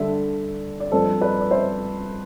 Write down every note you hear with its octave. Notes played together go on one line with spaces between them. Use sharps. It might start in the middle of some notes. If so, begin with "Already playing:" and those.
Already playing: D3 G3 D4 E5
D5
G2 F3 C4 A4 C5
B4 D5
D5
C5 E5